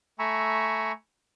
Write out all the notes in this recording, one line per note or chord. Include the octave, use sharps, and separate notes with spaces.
A3 G#5 A#5 B5 C#6 E6